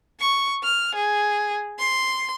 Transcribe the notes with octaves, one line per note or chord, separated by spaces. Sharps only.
C#6
F6
G#4
C6